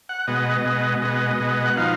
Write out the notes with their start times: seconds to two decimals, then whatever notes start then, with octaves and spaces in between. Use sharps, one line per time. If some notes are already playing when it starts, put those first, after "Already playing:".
0.09 F#5
0.27 B2 G#3 B3 D#5
0.65 B2 G#3 B3
1.02 B2 G#3 B3 D#5
1.40 B2 G#3 B3
1.65 F#5
1.77 F3 B3 D#4 F5